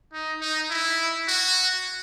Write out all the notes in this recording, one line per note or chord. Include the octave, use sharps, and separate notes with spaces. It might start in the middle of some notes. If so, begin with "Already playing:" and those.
D#4
D#4
E4
F#4